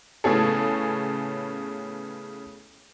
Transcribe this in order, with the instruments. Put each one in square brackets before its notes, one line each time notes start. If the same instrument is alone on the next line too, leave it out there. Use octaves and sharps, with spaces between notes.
[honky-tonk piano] A2 C#3 B3 C#4 G#4 A4